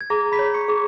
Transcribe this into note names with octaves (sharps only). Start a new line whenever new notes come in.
G#6
G#4 A#5 A#6
B5 B6
C#5
C#6 C#7
G#4